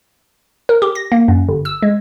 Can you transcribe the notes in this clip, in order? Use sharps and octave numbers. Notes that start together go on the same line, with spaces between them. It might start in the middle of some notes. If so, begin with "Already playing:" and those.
A#4
G4
A#6
A#3
F#2
G1
E6
G#3